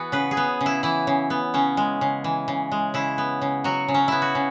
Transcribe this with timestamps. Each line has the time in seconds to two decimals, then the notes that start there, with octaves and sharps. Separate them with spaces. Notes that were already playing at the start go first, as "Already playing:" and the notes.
Already playing: E3 B3 F#4 G#4
0.12 C#3 B4
0.31 G#4
0.37 B3
0.61 C#3
0.66 E4
0.83 E3 E4
1.07 C#3
1.30 B3
1.54 C#3 C#4
1.77 G#3
2.01 C#3
2.24 E3
2.48 C#3
2.72 G#3
2.94 C#3 E4
3.18 B3
3.41 C#3
3.64 F#3 F#4
3.88 C#3
3.94 C#4
4.08 B3 E4
4.22 F#4
4.35 C#3